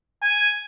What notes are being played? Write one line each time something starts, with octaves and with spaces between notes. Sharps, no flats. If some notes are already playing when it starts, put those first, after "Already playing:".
G#5